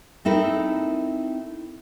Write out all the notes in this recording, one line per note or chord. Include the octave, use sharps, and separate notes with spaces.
C4 D#4 E4 A4 A#4